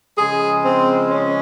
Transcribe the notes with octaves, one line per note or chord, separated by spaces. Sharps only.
C#3 F3 G#3 G#4
C4
C#4